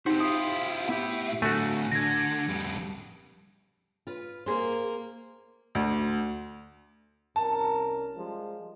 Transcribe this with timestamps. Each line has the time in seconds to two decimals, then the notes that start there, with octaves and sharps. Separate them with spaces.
0.06 C4 D#4 F#4 G4 C5
0.20 E4 F4 D#6
0.89 A2 B3 E4 G4 E5
1.42 A2 D3 A3 F#4 G#5
1.91 D3 G#6 A#6
2.48 F2 G3
4.07 F4 B4
4.46 A#3 G#4 C5
5.75 D2
7.36 C2 C#4 A#4 A5
8.17 F3 G3 G#3